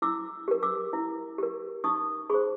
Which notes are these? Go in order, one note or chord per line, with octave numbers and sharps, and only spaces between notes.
E4 D6 E6
G4 A#4
D6 E6
E4
G4 A#4
D#4 C#6 D#6
G#4 C5 B5 C#6